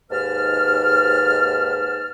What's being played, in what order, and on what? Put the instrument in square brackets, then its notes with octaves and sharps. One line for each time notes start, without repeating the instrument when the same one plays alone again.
[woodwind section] D#2 G#2 B4 A5 F6